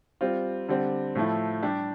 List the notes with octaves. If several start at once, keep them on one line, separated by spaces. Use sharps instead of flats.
G3 C4 F4
D3 G3 C4
A2 F3 A3 E4
G3 D4 G4